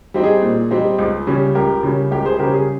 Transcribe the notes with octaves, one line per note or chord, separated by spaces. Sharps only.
G3 C4 D#4
G#4
A#2
G3 C4 D#4
C#2
C#3 G3 C#4
C#2 G4 A#4
C#3 G3 C#4
C#2 G4 A#4
G#4 C5
C#3 G3 C#4 G4 A#4
G#4